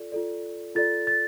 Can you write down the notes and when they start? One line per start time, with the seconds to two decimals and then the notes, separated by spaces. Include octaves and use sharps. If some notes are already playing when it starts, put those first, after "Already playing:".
Already playing: F4 A4 D5
0.12 F4 A4 D5
0.75 F4 A4 D5 A6
1.07 A6